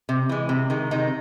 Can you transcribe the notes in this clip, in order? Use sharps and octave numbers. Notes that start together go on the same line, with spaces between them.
C3
E3 G#3
C3
D#3 G#3
C3 D#3 D#4